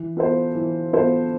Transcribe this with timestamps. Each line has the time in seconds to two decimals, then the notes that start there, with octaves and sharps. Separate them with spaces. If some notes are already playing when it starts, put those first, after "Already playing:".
Already playing: E3
0.17 B3 F4 A4 C5
0.55 E3
0.93 B3 F4 A4 C5